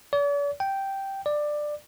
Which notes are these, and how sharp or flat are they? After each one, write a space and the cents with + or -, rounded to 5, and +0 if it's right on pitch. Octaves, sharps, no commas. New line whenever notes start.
D5 -45
G5 -5
D5 +15